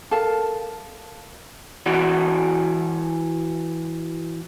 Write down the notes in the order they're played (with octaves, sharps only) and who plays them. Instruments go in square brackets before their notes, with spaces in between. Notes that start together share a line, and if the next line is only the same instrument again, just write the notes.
[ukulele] A4 A#4 F5 A5
[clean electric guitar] E3 F#4 D5